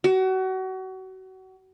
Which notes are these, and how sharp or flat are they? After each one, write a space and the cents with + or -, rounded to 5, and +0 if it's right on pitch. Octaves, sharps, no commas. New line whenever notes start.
F#4 +30